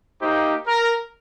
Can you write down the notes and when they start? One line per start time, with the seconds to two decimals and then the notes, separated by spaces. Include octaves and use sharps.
0.20 A#3 D#4 G4 C5
0.66 A#4